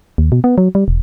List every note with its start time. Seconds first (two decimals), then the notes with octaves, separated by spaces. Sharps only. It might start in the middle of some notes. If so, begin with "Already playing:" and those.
0.18 D#2
0.32 B2
0.44 B3
0.58 F#3
0.75 G3
0.88 E1